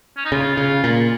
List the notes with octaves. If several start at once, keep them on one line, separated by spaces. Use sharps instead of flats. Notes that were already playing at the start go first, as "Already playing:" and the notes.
C#4
D#4
C#3 F4
C#3
A#2